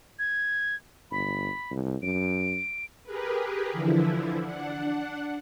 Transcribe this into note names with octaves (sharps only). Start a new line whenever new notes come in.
G#6
G1 B5
C2
F#2 D7
G4 G#4 A#4 B4
D3 E3 F3 E4
D4 F#5